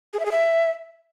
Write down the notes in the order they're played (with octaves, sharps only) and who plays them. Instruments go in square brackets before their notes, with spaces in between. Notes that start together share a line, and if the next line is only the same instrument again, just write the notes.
[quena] G#4
E5
G#4
E5